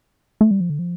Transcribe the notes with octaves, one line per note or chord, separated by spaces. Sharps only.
A3
G3
F3
D3
F3